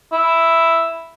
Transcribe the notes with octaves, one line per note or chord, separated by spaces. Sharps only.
E4